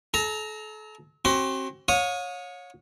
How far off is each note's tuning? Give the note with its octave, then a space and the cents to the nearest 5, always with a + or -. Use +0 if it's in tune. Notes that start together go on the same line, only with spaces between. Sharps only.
A4 -40 A#5 +0
C4 +35 F#4 +35 C6 -40
C#5 +0 F5 +45 D#6 +0